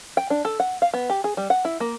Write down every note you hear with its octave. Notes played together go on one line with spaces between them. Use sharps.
G5
D4
A4
F#5
F5
B3
G4
G#4
G3
F#5
E4
A#3